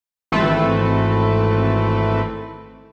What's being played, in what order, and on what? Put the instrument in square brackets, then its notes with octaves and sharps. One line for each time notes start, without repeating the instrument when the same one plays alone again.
[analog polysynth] G#1 E3 A3 C4 A4 B4